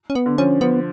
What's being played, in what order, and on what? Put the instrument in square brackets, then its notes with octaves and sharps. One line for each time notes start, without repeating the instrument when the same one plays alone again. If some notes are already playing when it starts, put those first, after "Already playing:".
[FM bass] C#4
B3
[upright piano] D3
[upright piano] F3 [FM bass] C#4
[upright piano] F3 [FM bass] B3